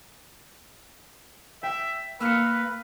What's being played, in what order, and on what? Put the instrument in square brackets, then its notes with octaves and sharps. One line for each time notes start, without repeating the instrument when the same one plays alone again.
[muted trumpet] E5 [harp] G5
[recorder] A#3 [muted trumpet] B4 [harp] E6 F6 C#7